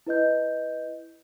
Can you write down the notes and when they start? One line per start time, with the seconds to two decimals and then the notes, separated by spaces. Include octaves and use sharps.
0.07 E4 B4 D#5 G6